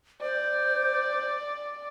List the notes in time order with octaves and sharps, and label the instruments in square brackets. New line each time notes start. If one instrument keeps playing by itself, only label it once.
[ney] C5 [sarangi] D5